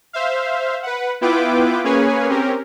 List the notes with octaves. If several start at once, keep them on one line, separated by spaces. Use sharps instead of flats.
C5 E5 F5
B4 F#5
B3 E4 F4 B4 G5 D6
A#3 C#4 G#4 B4 C#5 G#5
C4 C#4 G4 A#4